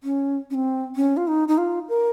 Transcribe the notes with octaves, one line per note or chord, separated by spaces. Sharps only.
C#4
C#4
C4
C#4
F4
D#4
D#4
F4
A#4